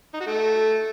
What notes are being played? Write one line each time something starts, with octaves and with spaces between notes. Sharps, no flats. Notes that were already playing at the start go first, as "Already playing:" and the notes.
D#4
F#4
A3